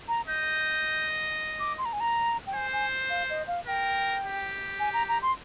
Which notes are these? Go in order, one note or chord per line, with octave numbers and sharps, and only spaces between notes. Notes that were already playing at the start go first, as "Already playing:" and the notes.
A#5
D#5 G6
D6
C6
A#5
G#5
A#5
G5
C5 G#5
G#5
F5
D#5
F5
A#4 G5
G4
G#5
A#5
A#5
C6